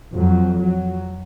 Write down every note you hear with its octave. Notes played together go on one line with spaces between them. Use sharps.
F2 F#3
F#3